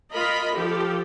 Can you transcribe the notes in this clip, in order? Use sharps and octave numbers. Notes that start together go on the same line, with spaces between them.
F4 A#4 D#5 B5
F3 G4 A4